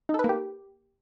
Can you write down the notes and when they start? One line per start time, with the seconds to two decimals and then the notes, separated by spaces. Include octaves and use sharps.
0.09 D#4
0.14 A4
0.19 B4
0.24 A#3
0.29 G4